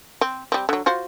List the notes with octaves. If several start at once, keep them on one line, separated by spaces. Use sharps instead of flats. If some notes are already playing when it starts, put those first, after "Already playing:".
C4
G3 C4
D3 F#3
F4 F#4 C5